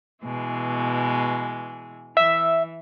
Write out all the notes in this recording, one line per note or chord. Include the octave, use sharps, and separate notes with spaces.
B2 E3 G#3
E3 E5